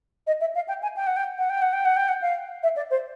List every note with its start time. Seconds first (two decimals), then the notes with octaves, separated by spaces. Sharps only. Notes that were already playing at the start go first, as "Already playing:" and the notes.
0.27 D#5
0.41 E5
0.55 F5
0.68 G5
0.82 G#5
0.96 G5
1.07 F#5
1.16 G5
1.38 F#5
1.50 G5
1.62 F#5
1.73 G5
1.85 F#5
1.96 G5
2.08 F#5
2.21 F5
2.63 E5
2.76 D5
2.90 C5